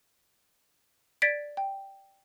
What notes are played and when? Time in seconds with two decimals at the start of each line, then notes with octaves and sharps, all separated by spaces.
1.22 D5 G#6 A6 B6 D7
1.57 G5